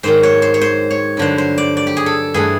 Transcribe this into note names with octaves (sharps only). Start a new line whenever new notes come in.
G#2 D#3 F#3 C5
C#5
C5
C#5
C5
C#5
G2 D3 F#3 C5
C5
D5
D5
G4
G#4
A4
G2 E3 A3 G#4